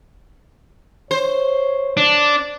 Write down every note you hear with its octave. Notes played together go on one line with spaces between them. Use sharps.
C5 C#5
D4